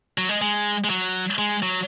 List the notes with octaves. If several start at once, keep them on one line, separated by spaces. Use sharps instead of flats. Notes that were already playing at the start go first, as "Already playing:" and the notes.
F#3
G#3
G#3
G#3
F#3
G#3
F#3